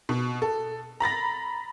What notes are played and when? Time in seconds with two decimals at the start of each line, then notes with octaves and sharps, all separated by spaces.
0.09 B2
0.42 A4
1.00 A#5 B5 A6 A#6